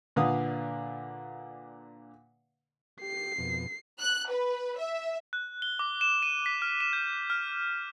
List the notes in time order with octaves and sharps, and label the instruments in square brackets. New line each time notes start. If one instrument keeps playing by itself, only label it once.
[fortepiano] A#2 D3 B4 F5 D#6
[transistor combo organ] G4 [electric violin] C7
[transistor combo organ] F2 B2
[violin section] F#6
B4
E5
[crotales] F#6
G7
D6
E7
D#7
B6
F6
E7
G6
F6